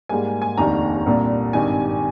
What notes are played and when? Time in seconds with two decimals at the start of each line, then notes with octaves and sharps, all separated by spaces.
0.09 G#2 G3 A#3 G#5
0.42 G#5
0.58 F1 D#2 D#3 A#3 D4 A#5
1.06 C2 A#2 G3 D4
1.53 G#1 G2 D#3 G#5